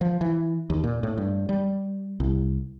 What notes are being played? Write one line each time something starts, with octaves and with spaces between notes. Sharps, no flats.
F3
E3
D#2
A#2
A2
G2
G3
C2